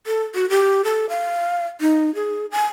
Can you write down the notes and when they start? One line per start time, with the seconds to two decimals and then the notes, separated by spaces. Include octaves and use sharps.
0.07 A4
0.35 F#4
0.50 G4
0.84 A4
1.09 F5
1.81 D#4
2.15 G#4
2.51 G#5